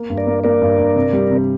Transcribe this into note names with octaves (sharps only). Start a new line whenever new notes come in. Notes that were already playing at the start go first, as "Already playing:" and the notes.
Already playing: A#3
G2
A#4 D5
A#3
A#3 A#4 D5
G2
G2
C3
G3
C3